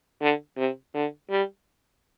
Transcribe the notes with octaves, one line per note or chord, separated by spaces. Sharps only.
D3
C3
D3
G3